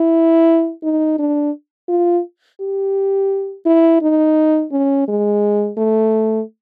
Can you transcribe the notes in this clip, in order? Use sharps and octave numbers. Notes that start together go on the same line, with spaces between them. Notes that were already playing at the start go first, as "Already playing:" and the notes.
Already playing: E4
D#4
D4
F4
G4
E4
D#4
C#4
G#3
A3